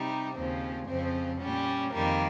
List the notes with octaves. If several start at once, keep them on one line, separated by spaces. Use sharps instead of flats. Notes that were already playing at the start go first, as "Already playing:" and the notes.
Already playing: C3 G3 D#4
D#2 C#3 F3 C4
F2 C#3 F3 C4
A#2 G3 C#4
F2 D#3 G3 A#3